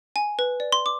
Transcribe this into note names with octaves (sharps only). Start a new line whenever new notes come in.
G#5
B4
D5
C6
D6